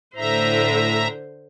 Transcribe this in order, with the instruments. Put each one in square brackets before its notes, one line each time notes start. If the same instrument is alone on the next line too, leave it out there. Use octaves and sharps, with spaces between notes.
[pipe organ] A2 E5 A#5 [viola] D3 C5